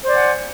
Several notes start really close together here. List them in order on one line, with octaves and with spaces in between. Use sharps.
C5 D5 G#5 F#5